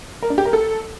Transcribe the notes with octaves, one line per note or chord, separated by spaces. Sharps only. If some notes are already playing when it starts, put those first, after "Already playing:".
A#4
D4
G4
A#4
A4